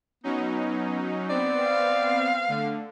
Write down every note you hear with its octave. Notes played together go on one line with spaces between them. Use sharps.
F#3 B3 C#4 D#4
B3 C4 D5
F5
D3 A3